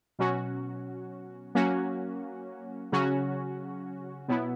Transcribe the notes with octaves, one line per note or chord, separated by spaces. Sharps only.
B2 F#3 C#4 F#4
F#3 A#3 C#4 F#4
C#3 F#3 C#4 F#4
B2 F#3 B3 E4